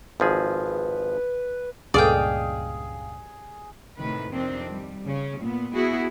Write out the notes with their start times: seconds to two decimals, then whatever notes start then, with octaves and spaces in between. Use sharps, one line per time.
0.20 G#1 F3 G#4 B4
1.94 C#2 G2 A#2 G#4 D5 D#5 F5 G5
3.96 A2 C3 D#3 B4
4.32 F2 C3 D#3 C4 D4
4.69 G3
5.06 C#3 C#4
5.39 A#2 B3
5.73 B3 E4 F#4 G#4